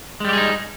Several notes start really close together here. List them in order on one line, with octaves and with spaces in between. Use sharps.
G#3 G3 G4 G#4 D#4